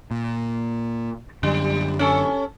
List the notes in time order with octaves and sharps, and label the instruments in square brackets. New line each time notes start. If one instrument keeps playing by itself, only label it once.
[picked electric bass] A#2
[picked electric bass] F#2 D3 [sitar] G3
[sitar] C#4 A4